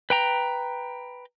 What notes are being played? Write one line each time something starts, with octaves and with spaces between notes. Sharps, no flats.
B4 G5 A#5